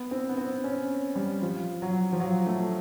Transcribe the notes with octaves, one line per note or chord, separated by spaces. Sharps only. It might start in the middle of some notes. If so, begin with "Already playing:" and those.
Already playing: B3
C4
B3
C4
C#4
G3
F3
F#3
F3
F#3
A3